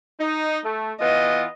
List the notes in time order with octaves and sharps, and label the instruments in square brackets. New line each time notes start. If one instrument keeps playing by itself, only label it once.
[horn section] D#4
A3
[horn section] E3 B3 F4 [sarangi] D#5